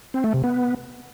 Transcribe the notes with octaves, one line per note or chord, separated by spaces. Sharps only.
C4
A3
C3
B3